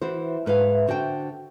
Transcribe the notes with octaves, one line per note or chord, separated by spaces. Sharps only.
E3 F#4 C5
G#2 B4 E5 F5
D3 F#4 C5 G5